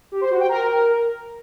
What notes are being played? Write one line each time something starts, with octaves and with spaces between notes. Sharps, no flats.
G4
C5
F#4
G5
A#4